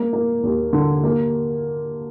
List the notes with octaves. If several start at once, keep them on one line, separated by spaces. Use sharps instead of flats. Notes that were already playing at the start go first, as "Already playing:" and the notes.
Already playing: A#3
A#3
D#2
D3
A#3